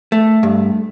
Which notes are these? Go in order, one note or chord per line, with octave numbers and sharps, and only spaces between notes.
A3
G2